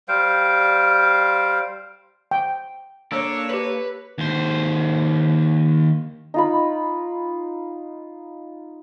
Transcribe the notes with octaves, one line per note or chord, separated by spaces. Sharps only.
G3 C5 F5 G5
G5
A#3 D4 A4 C#5
G4 B4 F#7
D#2 C5
D#4 F4 B5